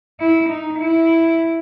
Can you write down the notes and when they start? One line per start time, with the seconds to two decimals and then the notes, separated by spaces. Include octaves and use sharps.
0.20 E4
0.49 D#4
0.79 E4